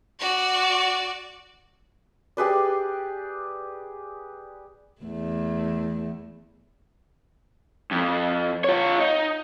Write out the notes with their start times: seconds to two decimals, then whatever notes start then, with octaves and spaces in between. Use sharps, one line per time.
0.20 F#4 D5
2.37 G4 G#4 B4 D5
5.02 E2 A3
7.91 F2
8.64 F4 C#5
9.00 D#4